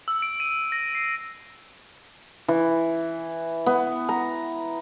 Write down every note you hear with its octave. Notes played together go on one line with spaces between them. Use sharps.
E6
D7
D#7
A#6
C7
E3
B3
A#5